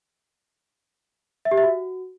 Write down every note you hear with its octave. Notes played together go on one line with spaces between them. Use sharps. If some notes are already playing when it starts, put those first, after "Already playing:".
E5
G4
E5
F#4